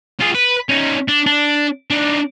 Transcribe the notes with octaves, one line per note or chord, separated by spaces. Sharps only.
F4 G#4
B4
C#4 D#4
D4
D4
D4 D#4